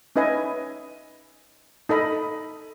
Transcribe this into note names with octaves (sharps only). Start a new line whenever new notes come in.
C#4 D#4 B4 D#5 E5 G#5
D#4 A4 D#5 B5